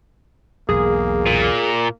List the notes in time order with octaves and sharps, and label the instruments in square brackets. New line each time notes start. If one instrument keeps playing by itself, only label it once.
[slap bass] E1 B1 [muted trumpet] A#3 [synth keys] G#4
[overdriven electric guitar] A#2